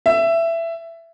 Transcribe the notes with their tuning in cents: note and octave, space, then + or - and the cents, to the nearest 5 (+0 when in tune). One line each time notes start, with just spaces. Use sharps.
E5 +15